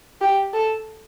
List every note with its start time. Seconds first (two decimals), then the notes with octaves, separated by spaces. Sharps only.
0.21 G4
0.53 A4